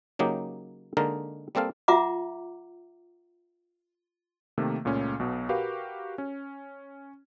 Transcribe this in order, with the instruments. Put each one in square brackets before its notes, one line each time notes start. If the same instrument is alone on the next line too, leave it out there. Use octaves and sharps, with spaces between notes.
[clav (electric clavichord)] C#3 F#3 A#3 D#4 G4
D3 G#3 A#3 D#4 A#4
G3 A#3 C4 A4 F5
[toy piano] F4 E5 F#5 A#5 D6
[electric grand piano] C3 D#3 A3 A#3
C#2 A#2 A3 C#4
B1 B2
F#4 G4 A#4 B4 F5
C#4